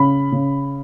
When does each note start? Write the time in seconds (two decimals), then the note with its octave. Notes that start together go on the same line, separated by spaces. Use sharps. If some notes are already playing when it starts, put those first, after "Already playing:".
Already playing: C#3 B5
0.32 C#3